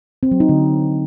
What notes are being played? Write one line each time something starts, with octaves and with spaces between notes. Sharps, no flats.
C4
F#3
D#4
D3